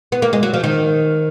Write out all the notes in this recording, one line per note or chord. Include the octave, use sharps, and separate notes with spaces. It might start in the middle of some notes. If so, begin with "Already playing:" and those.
B3
A#3
G#3
F#3
F3
D#3